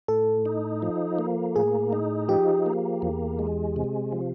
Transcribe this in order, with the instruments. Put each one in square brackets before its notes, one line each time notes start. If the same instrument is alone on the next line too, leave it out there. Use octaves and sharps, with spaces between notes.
[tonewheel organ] A2 [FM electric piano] A4
[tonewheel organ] D#4
F3
A#3
[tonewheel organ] A2 [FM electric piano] G#4
[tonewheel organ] D#4
[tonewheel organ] F3 [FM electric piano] G4
[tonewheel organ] A#3
E2
G#3
C3
F3